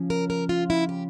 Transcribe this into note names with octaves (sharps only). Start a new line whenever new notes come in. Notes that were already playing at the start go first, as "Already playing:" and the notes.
Already playing: C#3 F3 C#4
A#4
A#4
F4
E4
G4